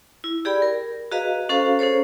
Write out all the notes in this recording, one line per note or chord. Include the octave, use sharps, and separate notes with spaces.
E4
G4 G#4 D5 G5 B5
A#4
F#4 G#4 B4 D#5 F5 A#5
C#4 F#4 A4 C5 F5 A#5
C#4 G#4 A4 C5 C#5